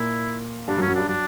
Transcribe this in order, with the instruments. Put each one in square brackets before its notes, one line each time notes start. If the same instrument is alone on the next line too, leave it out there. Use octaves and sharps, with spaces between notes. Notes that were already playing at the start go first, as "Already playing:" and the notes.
Already playing: [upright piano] A#2 A#3 [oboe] E4
[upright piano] G2 G3 [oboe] D4
[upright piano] F#2 F#3
[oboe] C#4
[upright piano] F#2 F#3
[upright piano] G2 G3 [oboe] D4
[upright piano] F#3 [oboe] D4